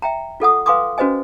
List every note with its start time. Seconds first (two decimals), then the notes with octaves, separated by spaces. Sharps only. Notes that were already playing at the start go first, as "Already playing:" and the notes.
0.02 E5 G5 A#5
0.40 F4 A4 F#5 D#6
0.66 B4 F5 G#5 C6 D6 D#6
0.98 C#4 F#4 B4 C5 D#5 G#5